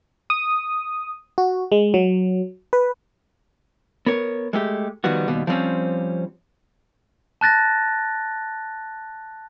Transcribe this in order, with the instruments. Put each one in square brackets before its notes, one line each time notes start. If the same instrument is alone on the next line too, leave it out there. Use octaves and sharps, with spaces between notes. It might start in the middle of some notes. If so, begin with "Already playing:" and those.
[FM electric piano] D#6
F#4
G#3
F#3
B4
[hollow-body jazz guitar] B3 A#4 C#5
G#3 A3 G4
D#3 F3 G3 B3 F#4
D#2 B2 G3
F3 G3 C4 C#4
[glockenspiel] A5 F#6 A6 A#6